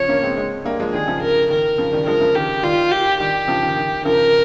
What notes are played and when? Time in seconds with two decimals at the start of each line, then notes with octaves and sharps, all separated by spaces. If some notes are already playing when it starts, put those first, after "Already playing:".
Already playing: C#3 F3 C#5
0.09 A#3 C#4
0.23 G#3 C4
0.37 G#3 C4
0.65 G3 A#3
0.79 F3 G#3
0.93 D#3 G3 G#4
1.08 C#3 F3
1.22 A#4
1.50 D#3 A#4
1.78 C#3 F3
1.92 D#3 G3
2.06 F3 G#3 A#4
2.21 C#3 F3
2.35 D#3 G4
2.63 D#3 G3 F4
2.91 G4
3.20 D#3 G3 G4
3.48 C#3 F3
3.63 D#3
3.77 D#3
4.05 C#3 F3 A#4